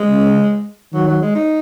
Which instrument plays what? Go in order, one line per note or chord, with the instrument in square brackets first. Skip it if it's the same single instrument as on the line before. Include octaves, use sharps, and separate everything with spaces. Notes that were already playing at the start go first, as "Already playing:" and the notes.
Already playing: [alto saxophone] G#3
[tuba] C#3
[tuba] D#3 [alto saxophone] F#3
[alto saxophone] F#3
G#3
D#4